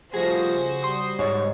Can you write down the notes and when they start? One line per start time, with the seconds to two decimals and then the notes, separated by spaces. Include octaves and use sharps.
0.14 C#3 F3 G3 A3 F#4 G#4 C5 A#6
0.83 G3 C6 D#6
1.19 G#2 C#5